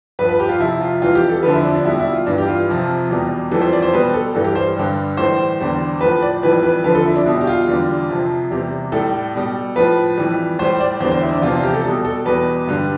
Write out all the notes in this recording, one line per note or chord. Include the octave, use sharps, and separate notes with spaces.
G2 F3 B4
B4
G4
F4
F2 C3 F3 E4
F4
F2 E3 G3 F4
G4
A4
F2 D3 F3 B4
E4
D4
D4
B2 G3 E4
E4
F4
G2 E3 G3 D4
G4
F4
F2 C3 F3
E2 B2 G3
F2 E3 G3 A4
C5
D5
C5
B2 G3 B4
A4
G2 E3 G3 A4
G4
C5
G2 D3 G3
A2 E3 G3 C5
E2 D3 G3
A2 F3 B4
D5
F2 E3 G3 B4
B4
F2 D3 F3 B4
A4
E4
D4
B2 G3 E4
G4
F4
E2 D3 G3
F2 C3 F3
E2 C3 G3 G4
A2 G3 A4
B2 G3
A2 F3 B4
F2 E3 G3
A2 G3 C5
D5
E2 D3 G3 C5
C5
E4
D4
E2 C3 F3 F4
F4
G4
A4
B2 G3 A4
A4
E2 B2 G3 B4
G2 D3 G3